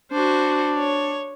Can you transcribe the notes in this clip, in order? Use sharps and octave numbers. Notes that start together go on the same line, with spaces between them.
D4 F#4 C5
C#5